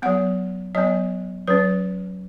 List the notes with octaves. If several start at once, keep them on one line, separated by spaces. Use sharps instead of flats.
F#3 B3 F#5
F#3 B3 D#5
F#3 C#4 B4